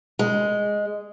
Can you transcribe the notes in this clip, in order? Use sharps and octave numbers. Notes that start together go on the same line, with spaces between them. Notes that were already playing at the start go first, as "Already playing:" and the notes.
G#3